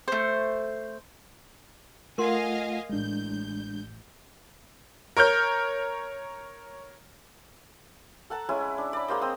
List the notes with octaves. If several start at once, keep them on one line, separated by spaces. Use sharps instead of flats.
A3 C5
A3 F4 A#4 D#5 F5 F#5 G#5 C6
A1 G#3 D4 G6
A#4 C#5 F6 G6
A4 F#5 A5 A#5
G#3 C#4 E4 G#5
D4
D5 B5
G#3 A#3 C5 D#5
C4 D#6 E6